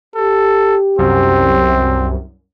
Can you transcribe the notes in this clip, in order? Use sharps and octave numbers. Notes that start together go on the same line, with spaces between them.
G4 A4
C2 F#2 C4